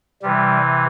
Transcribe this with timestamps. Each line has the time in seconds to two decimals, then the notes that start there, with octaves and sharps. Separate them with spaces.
0.22 C3 E3 G3